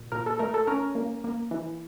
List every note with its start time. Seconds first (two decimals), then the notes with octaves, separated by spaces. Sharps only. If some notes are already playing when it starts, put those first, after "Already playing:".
Already playing: A#2
0.12 A#2 A#4
0.26 A4
0.39 A3 A#4
0.54 A4
0.67 C#4 A#4
0.95 A#3
1.24 A#3
1.51 E3